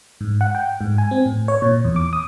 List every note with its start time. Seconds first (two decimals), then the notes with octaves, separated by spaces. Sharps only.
0.21 G#2
0.41 F#5
0.55 G5
0.81 G#2
0.98 G#5
1.11 C4
1.26 A2
1.48 C#5
1.62 A#2
1.85 E2
1.96 D6
2.13 D#6